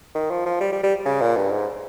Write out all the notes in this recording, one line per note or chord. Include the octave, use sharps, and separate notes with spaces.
D#3
F3
F3
G3
G3
G3
C#3
A#2
G2
G#2